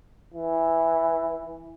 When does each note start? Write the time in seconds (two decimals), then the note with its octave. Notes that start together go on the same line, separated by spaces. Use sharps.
0.34 E3